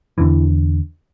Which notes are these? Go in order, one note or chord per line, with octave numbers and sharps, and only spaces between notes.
E2 D3 E3